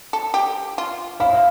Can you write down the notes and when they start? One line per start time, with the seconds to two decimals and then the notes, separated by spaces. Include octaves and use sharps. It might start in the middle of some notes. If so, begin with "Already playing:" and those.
0.13 A4
0.34 G4
0.78 F4
1.20 E4 F5